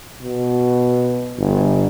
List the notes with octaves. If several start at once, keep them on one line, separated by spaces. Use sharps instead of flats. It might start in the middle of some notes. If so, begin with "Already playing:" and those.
B2
G1